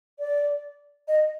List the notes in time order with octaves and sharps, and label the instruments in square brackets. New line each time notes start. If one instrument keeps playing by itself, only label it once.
[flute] D5
D#5